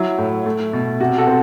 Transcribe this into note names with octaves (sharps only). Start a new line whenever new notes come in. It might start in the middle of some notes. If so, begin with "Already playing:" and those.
Already playing: F#3 E4
A2
A3
B2
C3 F#4
F#4 A4
C4